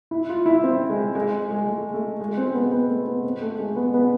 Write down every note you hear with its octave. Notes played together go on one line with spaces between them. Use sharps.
E4
F4
E4
C4
G#3
G#3
G#3
A3
A3
G#3
C4
B3
B3
A3
B3
C4
A3
G#3
B3
B3